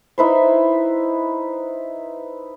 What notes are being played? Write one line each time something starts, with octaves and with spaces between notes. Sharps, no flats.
D#4 E4 B4 C5